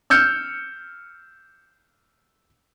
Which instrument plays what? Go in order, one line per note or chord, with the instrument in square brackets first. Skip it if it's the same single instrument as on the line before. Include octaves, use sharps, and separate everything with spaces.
[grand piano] E6 F6 G6 C#7